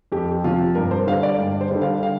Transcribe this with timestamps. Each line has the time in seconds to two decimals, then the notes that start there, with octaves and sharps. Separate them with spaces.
0.12 F2 G4
0.44 C3 F3 F4
0.75 G2 A#4
0.91 C5
1.07 D3 G3 F5
1.23 D5
1.39 G2
1.61 C5
1.71 D3 G3
1.82 F5
2.03 F5